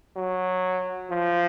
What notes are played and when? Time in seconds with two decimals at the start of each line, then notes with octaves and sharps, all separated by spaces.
0.16 F#3
1.10 F3